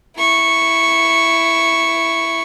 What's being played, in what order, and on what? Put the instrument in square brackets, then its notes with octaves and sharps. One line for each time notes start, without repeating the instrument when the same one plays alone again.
[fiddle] E4 C#6